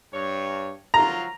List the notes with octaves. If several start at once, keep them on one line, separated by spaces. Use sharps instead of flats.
G2 C#5
F3 F#3 F4 A#5